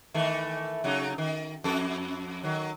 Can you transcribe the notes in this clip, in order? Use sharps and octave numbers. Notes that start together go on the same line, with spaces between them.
D#3 E3 A3
C#3 F#3 D#4
D#3
F2 A4
D#3 F#3